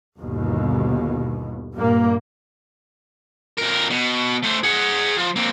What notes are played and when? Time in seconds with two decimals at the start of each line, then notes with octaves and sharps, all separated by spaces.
0.19 G1 D#2 B2
1.74 G2 A#2 A#3
3.58 F2 A#4
3.90 B2
4.43 A3 C5
4.63 G#4 F#5
5.18 F3
5.36 A#3 C4